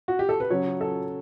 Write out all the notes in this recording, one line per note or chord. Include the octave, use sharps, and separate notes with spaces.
F#4
G4
A4
B4
C#3 F#3 C#4 C#5
A4